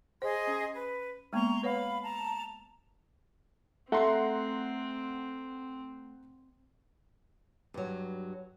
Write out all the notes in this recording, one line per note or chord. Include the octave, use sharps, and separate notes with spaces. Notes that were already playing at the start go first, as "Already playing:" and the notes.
G#4 C5 D#5 C6
C#4
B4
G#3 A#3 B3 A#5 C6 C#6
B4 C#5 F5 F#5 B5
A5 A#5
A3 C4 F#5 A#5 C6
G2 F#3